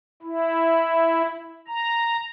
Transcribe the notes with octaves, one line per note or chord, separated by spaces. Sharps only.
E4
A#5